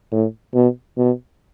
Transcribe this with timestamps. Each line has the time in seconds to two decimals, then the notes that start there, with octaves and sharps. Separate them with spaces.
0.12 A2
0.54 B2
0.98 B2